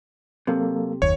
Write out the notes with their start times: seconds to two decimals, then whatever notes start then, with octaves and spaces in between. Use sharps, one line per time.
0.47 C3 F#3 A#3 A4
1.02 F#1 D#2 C#5